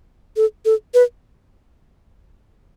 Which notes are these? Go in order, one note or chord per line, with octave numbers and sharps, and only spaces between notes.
A4
A4
B4